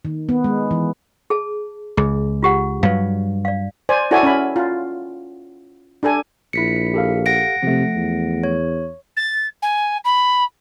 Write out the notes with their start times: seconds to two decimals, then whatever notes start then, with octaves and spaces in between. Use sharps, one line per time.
0.05 D#3
0.29 B3
0.44 G#3
0.71 E3
1.30 G#4 A5
1.97 C#2 G#4
2.43 F4 G4 F#5
2.83 G2 F#3 B4 F5
3.45 D5 F5
3.89 C5 D5 G#5
4.11 E4 F#4 A4 C#5 D5 G#5
4.23 C#4 B5
4.56 F4
6.03 D4 G4 A4 G#5
6.53 A#1 E4 B6 C#7
6.94 G4 A4 F5
7.26 F#5 A#6 D7
7.63 C3 F3 A3
7.95 E2
8.44 C#5
9.16 A6
9.62 G#5
10.04 B5